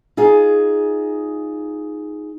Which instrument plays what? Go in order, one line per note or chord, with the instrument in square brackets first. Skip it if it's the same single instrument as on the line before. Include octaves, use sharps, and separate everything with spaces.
[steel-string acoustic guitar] D#4 F4 G#4 F5